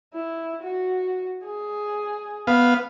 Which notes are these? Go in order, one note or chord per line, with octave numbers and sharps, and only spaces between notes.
E4
F#4
G#4
B3 F5